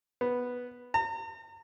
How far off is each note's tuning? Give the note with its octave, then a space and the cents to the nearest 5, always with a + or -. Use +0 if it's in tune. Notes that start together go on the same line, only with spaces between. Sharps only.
B3 -5
A#5 -40